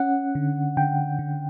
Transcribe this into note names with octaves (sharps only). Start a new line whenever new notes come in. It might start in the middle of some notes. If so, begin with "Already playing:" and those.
Already playing: C#4 F#5
D3
D3 G5
D3